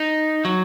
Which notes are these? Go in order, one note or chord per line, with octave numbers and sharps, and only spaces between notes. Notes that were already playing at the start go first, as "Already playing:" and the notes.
Already playing: D#4
F#3